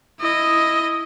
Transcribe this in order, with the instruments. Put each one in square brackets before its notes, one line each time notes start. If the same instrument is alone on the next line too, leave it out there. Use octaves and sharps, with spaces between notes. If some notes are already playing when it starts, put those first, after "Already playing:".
[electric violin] E4 D#5